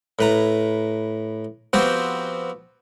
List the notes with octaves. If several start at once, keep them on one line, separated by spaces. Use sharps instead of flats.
A2 B4 A#5
F3 B3 C4 F#4 G4 C5